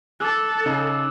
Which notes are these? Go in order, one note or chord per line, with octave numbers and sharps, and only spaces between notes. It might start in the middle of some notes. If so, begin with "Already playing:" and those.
A4 D6 E6 F#6
C#3 D#4 G#4